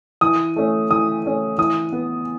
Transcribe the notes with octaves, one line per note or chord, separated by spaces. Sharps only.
E3 D#6
A3 C#4
E3 D#6
A3 C#4
E3 D#6
B3